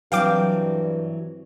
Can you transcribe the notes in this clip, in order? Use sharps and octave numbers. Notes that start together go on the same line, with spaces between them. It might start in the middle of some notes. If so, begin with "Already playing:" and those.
G2 E3 F#3 C4 F5 G5 D6